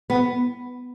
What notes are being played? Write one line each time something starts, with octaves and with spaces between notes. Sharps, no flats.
B3